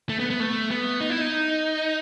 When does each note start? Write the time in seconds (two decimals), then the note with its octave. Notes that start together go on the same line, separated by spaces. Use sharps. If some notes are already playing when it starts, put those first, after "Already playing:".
0.09 A3
0.19 B3
0.30 B3
0.40 A3
0.71 B3
1.01 D#4
1.10 E4
1.21 D#4